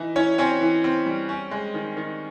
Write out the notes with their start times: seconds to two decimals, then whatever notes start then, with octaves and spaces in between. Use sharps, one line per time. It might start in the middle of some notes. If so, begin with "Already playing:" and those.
Already playing: E3 D#4 E4
0.16 C#4 E4 C#5
0.38 C4 C#4 C#5
0.61 E3
0.84 C4
1.06 G3
1.29 C#4
1.51 G#3
1.74 D#3
1.97 D#3